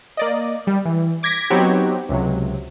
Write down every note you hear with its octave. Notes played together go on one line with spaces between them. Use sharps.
A#3 D5 D#5
G3
E3
D6 G#6 A#6 B6
F#3 B3 C4 D#4 F#4 G4
C#2 C3 F#3